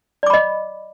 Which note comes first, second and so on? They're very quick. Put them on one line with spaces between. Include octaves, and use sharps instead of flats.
D5 D6 B5 D#5